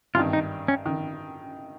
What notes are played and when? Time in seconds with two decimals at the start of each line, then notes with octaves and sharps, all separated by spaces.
0.15 G#1 G2 D#3 F4
0.33 D#4
0.68 C#4
0.86 D#3